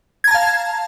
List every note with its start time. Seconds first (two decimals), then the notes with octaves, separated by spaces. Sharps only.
0.24 G#6
0.28 A#5
0.31 A5
0.34 F5